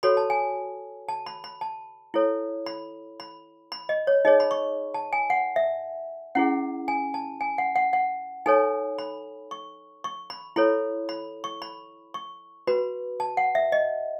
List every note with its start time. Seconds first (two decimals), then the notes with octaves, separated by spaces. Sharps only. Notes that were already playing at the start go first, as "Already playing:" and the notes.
0.03 F#4 A4 C#5 B5
0.17 A5
0.30 G#5
1.08 A5
1.26 B5
1.44 B5
1.61 A5
2.14 E4 A4 C#5
2.66 B5
3.20 B5
3.72 B5
3.89 D#5
4.07 C#5
4.25 D#4 G#4 C#5 D#5
4.40 B5
4.51 C#6
4.94 A5
5.13 G#5
5.30 F#5
5.56 E5
6.35 C#4 E4 G#4 F#5
6.88 G#5
7.14 A5
7.41 G#5
7.58 F#5
7.76 F#5
7.93 F#5
8.46 D#4 A4 C#5 G#5
8.98 B5
9.51 C#6
10.04 C#6
10.30 B5
10.56 E4 A4 C#5 B5
11.09 B5
11.44 C#6
11.62 B5
12.14 C#6
12.67 F#4 B4 B5
13.20 A5
13.37 F#5
13.55 E5
13.72 D#5